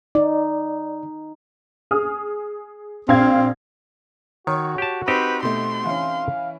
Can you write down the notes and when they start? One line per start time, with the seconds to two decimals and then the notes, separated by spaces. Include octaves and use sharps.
0.15 D#4 D5
1.91 G#4 D#6 F6
3.08 A#1 C4 F5 G#6
4.47 D#3 F#4 C#5
4.78 G4 A5
5.08 C4 D#4 G4 B4 C5
5.43 B2 A3 C6
5.85 E3 C#4 F5